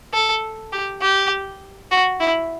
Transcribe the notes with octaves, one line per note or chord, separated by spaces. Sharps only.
A4
G4
G4
F#4
E4